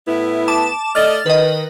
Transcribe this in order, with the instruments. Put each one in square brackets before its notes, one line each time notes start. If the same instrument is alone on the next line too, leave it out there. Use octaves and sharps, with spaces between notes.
[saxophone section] A2 B3 E4
[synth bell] A5 D6 E7
[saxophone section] A3 D5 D#5 [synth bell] F6 A6
[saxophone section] D#3 [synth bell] B4 D#5